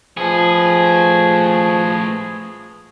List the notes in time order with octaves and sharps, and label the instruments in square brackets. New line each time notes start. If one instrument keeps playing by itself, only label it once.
[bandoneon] F3 [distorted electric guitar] A3 B4 [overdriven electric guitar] G#4